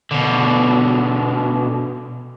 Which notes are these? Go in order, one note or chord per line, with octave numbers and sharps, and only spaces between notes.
B2 D3